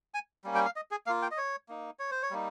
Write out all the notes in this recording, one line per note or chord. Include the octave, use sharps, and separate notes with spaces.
G#5
G3 A#3 C#4
G5
F5
D#5
G#4
A#3 F4 F5
G5
D#5
C#5
A#3 D#4
C#5
C5
C#5
G3 A#3 D#4